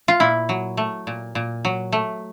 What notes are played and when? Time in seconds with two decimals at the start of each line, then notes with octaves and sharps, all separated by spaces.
0.08 F4
0.20 A#2 E4
0.49 F#3
0.77 A3
1.07 A#2
1.35 A#2
1.65 F#3
1.92 A3